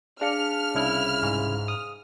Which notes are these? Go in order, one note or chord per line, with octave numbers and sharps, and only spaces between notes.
D4 G#4 F5 F6 C#7
C2 C#3 E4
G#2
D#6